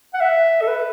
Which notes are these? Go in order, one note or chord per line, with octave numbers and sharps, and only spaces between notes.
F#5
E5
A4
B4